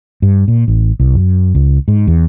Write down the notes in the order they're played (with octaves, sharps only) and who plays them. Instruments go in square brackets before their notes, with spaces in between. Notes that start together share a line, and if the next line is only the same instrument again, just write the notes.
[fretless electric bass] G2
A#2
A1
C2
F#2
C#2
G#2
E2